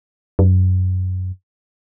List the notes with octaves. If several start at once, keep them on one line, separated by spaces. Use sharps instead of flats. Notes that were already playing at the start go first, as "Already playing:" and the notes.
F#2